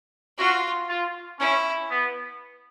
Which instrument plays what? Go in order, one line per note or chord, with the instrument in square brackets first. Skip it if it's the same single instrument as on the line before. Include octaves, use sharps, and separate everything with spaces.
[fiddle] F4 [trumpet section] F#4
[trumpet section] F4
[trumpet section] C#4 [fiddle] E4
[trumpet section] B3